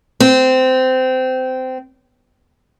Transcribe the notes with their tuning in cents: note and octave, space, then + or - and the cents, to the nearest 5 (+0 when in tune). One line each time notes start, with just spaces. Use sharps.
C4 -20